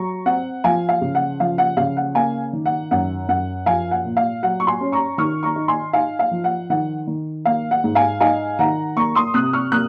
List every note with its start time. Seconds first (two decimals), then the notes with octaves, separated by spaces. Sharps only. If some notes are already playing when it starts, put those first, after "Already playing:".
Already playing: F#3 A#5 C#6
0.26 C4 F#5
0.64 F3 F5 G#5
0.89 F5
1.01 C#3
1.15 F#5
1.40 F3 F5
1.58 F#5
1.77 C#3 F5
1.97 F#5
2.15 A#3 F5 G#5
2.53 D#3
2.66 F#5
2.91 F#2 F#5
3.28 F#2 F#5
3.66 F3 F5 G#5
3.91 F#5
4.04 A#2
4.17 F5
4.43 F#3 F#5
4.60 C#6
4.67 G#5 C6
4.81 C#4
4.92 A#5 C#6
5.18 D#3 C#6 F6
5.43 A#5 C#6
5.56 D#4
5.68 G#5 C6
5.93 D#4 F5 G#5
6.19 F5
6.31 F3
6.44 F#5
6.70 D#3 F#5
7.07 D#3
7.45 A#3 F5
7.71 F#5
7.84 G#2
7.95 F5 G#5
8.20 D#4 F5 G#5
8.59 D#3 F#5 A#5
8.96 A#3 A#5 C#6
9.15 C6 D#6
9.34 C3 D#6 F#6
9.53 C#6 F6
9.72 A#3 D#6 F#6